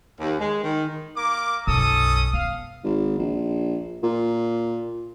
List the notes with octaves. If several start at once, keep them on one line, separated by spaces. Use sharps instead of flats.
D#2
G#3
D#3
A#3 A#4 D6
B1 F#2 C#4 A4 D#6
B3 F5
G#1
A#1
A#2